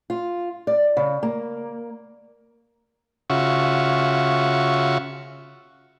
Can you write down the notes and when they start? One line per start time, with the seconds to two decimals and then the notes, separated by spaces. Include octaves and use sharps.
0.10 F4
0.67 D5
0.97 C#3
1.23 A#3
3.30 C#3 F4 F#4 E5 C#6